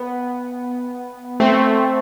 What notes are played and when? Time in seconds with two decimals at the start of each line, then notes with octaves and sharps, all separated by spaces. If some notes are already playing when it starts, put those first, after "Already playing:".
Already playing: B3
1.40 A3 C4